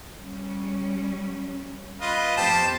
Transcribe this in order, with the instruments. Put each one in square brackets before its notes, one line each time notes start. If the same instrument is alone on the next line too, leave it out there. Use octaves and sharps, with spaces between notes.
[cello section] G3 C#4
[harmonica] F4 B4 D#5
[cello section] F2 B3 [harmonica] G4 C5 A5